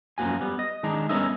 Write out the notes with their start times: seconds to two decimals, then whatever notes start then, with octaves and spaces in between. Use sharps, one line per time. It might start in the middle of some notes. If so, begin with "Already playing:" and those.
0.18 F#2 F3 A#3 F#4 G#5
0.41 G3 B3
0.59 D#5
0.83 D#3 G#3 D4 D#4
1.09 G3 B3 C#4 A#4 D#5 E5